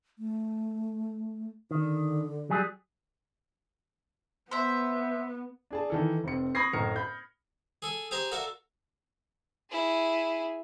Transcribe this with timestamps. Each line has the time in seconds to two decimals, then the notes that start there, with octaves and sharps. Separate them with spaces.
0.18 A3
1.71 D3 D#3
2.50 F#3 G3 G#4
4.51 B3 C5 E5
5.71 D4 G#4 A5
5.90 D#3 E3 A4
6.24 F1 C4 C#7
6.55 B5 C#6 D#6 G#6 A#6 C7
6.73 F#1 A2 A#5 F6 C#7
6.96 B5 G6
7.82 G#4 A4 G#5
8.11 G4 G#4 C5 G#5 A#5 C6
8.31 F#4 A4 A#4 D5 E5 F5
9.71 E4 G#4